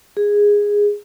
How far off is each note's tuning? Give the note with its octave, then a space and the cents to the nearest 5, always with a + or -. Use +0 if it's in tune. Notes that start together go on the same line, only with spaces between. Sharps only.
G#4 -10